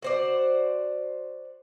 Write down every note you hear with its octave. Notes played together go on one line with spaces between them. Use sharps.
F#4 C5 D5